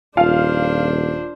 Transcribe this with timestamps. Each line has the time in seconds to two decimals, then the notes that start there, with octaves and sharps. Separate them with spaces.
0.17 D#1 D4 F4 C5 F5